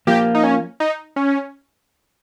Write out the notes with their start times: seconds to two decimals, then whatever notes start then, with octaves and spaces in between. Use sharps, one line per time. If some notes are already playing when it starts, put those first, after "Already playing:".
0.07 F3 A#3 F4 G4
0.35 D#4
0.43 C#4
0.80 D#4
1.16 C#4